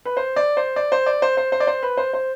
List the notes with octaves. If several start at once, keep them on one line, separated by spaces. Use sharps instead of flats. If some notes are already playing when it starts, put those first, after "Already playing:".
B4
C5
D5
C5
D5
C5
D5
C5
C5
C5
D5
C5
B4
C5
C5